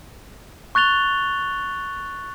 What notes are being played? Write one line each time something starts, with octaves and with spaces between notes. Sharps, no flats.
C#6 F#6 A6 F7 G7